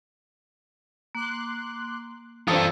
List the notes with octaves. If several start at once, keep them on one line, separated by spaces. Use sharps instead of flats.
A#3 C6 D6 F#6
G2 E3 F4 A4 C5 A#5 D#6 E6